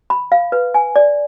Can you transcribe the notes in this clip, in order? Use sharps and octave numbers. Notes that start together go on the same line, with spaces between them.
B5
F5
B4
G#5
D5